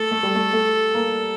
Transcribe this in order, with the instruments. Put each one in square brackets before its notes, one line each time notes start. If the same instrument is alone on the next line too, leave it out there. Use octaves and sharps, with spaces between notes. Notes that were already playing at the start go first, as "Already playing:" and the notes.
Already playing: [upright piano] A3 [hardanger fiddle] A4
[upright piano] A3
G3
A3
A3
A#3